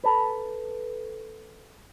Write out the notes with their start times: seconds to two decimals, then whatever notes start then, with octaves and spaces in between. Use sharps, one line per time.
0.04 A4 B4